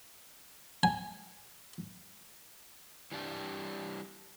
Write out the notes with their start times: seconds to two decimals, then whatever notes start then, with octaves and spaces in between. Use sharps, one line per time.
0.83 G#5
3.12 E3 G3 D4 G4